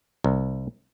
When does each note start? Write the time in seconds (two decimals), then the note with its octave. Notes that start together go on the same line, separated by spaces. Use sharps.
0.24 C2